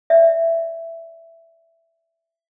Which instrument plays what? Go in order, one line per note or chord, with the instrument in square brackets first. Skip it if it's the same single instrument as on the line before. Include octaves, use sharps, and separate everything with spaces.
[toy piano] D5 E5